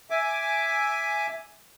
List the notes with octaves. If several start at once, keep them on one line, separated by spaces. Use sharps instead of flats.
E5 G#5 D6